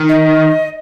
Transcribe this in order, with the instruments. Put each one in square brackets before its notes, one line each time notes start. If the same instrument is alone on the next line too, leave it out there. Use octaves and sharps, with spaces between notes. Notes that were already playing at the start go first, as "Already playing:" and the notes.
Already playing: [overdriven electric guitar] D#3
[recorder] D#5